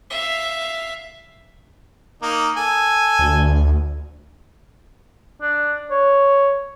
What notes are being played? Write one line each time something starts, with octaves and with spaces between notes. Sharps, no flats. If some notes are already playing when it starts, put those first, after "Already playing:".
E5 F5
A#3 D#4
A4 G#5
D2
D4
C#5